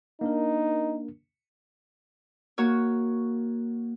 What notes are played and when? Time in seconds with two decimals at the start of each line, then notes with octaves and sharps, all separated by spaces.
0.21 A#3 D4 D#4 A#4
2.58 A#3 F#4 C#5